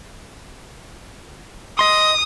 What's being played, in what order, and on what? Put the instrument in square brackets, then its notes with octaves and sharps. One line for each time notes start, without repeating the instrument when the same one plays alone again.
[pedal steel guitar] D#5 C6 [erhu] D#6